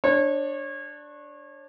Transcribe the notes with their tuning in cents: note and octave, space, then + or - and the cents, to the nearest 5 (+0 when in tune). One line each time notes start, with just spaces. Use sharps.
D4 +0 C#5 -30